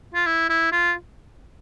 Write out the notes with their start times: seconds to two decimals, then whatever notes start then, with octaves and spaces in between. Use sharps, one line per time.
0.14 F4
0.26 E4
0.50 E4
0.72 F4